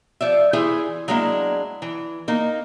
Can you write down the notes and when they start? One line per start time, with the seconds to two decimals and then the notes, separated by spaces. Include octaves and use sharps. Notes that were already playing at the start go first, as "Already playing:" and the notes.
0.21 F3 D5 E5
0.53 E3 E4 G#4 C5 G#5
1.08 F#3 G#3 A#3 D4 E4
1.82 E3
2.28 A#3 D#4